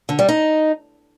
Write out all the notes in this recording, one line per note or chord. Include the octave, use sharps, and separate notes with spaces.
D3
G3
D#4